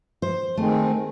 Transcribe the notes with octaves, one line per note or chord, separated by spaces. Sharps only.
C5
D#3 G#3 A3 C4